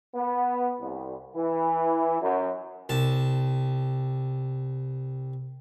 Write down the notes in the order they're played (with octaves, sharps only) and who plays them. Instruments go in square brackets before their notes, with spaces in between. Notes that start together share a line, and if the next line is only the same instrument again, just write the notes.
[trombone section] B3
C2
E3
F#2
[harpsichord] C2 A5